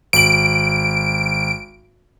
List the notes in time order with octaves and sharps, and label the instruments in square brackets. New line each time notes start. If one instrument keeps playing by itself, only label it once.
[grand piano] G#1 F#7 [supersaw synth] D7